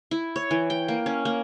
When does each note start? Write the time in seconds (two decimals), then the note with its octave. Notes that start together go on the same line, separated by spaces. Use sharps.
0.11 E4
0.36 C#5
0.51 E3
0.70 G5
0.88 A#3
1.06 C#4
1.25 A#3